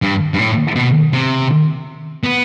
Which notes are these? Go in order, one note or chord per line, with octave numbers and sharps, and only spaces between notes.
G2
G2
A2
B2
C3
B3